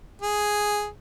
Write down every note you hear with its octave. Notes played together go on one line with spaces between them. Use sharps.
G#4